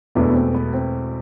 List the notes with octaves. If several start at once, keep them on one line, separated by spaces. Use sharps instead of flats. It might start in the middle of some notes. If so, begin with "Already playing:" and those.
E1 E2 B2 A3 B3 D4
B3
C4
B3
C4